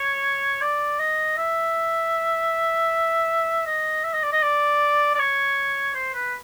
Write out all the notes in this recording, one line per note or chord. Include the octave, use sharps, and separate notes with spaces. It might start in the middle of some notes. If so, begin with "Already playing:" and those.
Already playing: C#5
D5
D#5
E5
D#5
E5
D#5
D5
D#5
D5
D5
C#5
C5
B4